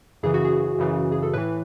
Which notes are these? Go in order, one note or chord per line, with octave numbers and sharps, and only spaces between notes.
F#2 C#3 E3 G#4
F#4
G#4
F#2 C#3 E3
G#4
A4
A2 E3 B4